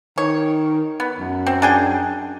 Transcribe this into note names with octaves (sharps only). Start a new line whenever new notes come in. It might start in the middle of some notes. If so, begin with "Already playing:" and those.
D#3 C#5
B3
F#2
C4
D4 G#4 G5